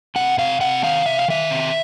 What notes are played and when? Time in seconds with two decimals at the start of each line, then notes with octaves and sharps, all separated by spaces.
0.16 C3 F#5
0.38 C3 F5
0.61 C3 F#5
0.83 D#3 F5
1.06 C3 E5
1.18 F5
1.28 D#3 E5
1.51 C3